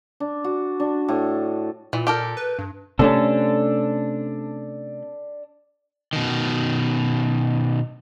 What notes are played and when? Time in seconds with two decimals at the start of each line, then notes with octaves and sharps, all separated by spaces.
0.20 D4
0.44 F#4
0.80 D4
1.08 A2
1.93 A#2 E3
2.07 G4 A4 A#4
2.37 B4
2.59 G2
2.99 C3 A3 C#4 D4 A4
6.13 B2 D#3